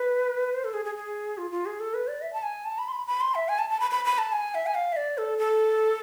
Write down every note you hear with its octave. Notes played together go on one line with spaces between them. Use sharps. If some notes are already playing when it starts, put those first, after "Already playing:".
Already playing: B4
C5
A4
G#4
G#4
G#4
F4
F4
G#4
A4
B4
D5
E5
A5
G#5
A5
B5
C6
B5
B5
C6
E5
G#5
A5
A5
B5
B5
B5
A5
G#5
E5
G#5
F5
E5
D5
A4
A4